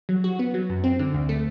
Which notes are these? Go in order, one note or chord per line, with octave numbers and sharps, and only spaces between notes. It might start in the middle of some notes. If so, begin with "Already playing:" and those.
F#3
F#4
B3
F#3
F#2
C4
D3
D2
A3